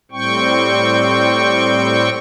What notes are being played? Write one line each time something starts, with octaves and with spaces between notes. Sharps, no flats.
A2 G3 C4 G5 C#6